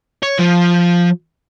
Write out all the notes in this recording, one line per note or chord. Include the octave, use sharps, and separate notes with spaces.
C#5
F3